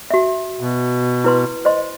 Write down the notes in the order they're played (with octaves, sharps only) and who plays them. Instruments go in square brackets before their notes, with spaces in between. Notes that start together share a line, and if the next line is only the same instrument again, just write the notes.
[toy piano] F#4 E5
[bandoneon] B2
[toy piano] E4 B4 C6
C5 D#5 C6